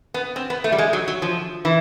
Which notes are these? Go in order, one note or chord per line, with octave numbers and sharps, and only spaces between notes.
B3
C4
B3
A3
G3
G#3
F#3
F#3
F3
E3